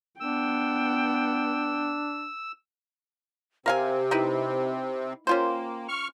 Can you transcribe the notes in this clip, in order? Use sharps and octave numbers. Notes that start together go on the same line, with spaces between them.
B3 D4 G5 E6
C3 C4 G4 A#4 F5 G#5
D#4 E4 B4
A#3 C#4 F4 C5 G5
C#6 F6